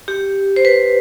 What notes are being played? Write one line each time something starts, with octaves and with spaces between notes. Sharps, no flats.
G4
C5
B4